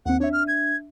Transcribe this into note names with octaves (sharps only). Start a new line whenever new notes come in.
D#2 C4 F#5
D4 C#5 E5
F6
G#6